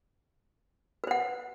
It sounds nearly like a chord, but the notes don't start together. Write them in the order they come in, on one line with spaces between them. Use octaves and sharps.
B4 C5 F#5